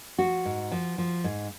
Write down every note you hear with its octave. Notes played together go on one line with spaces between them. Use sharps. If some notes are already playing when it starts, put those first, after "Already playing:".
F3 F#4
G#2
F3
F3
G#2